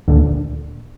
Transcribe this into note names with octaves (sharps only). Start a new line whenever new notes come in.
D2 A#2 D3